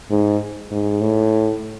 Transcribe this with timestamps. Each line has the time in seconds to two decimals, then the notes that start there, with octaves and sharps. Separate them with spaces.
0.11 G#2
0.71 G#2
1.01 A2